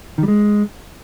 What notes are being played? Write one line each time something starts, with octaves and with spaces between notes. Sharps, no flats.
D#3
G3
G#3